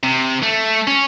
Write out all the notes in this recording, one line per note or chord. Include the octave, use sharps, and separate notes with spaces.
C3
A3
C#4